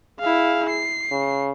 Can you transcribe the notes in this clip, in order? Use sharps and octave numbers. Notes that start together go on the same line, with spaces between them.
E4 G#4 F5
C7
C#3